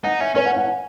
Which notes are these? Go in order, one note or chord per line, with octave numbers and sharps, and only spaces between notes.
D#4 F#5
C#4 E5
C#4 C#5
F#5
F#5
G#5